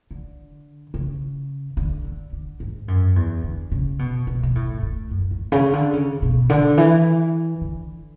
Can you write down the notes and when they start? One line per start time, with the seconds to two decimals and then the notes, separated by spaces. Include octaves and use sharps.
0.11 D3
0.94 C#3
1.77 D3
2.04 D3
2.33 D3
2.60 G#2
2.88 F#2
3.16 E2
3.44 D3
3.72 C#3
3.99 B2
4.27 B2
4.43 B2
4.55 A2
4.83 A2
5.11 F#2
5.31 A2
5.52 C#3
5.73 D3
5.93 C#3
6.22 B2
6.50 D3
6.77 E3
7.61 D3